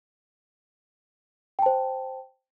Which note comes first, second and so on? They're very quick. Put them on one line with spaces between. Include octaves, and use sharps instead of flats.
G5 A5 C5